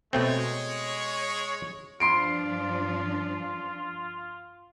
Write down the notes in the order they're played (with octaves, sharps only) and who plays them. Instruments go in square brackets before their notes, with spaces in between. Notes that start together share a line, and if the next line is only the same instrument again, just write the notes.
[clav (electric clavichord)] B2 A3 C4 [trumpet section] G#3 C#5
[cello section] G2 F3 D4 [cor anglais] F4 [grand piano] C6 C7 D7